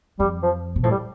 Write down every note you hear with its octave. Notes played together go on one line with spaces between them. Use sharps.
F2 G3
F3
B2
A2 F3
G3